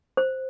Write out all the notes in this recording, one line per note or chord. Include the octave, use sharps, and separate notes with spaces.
C5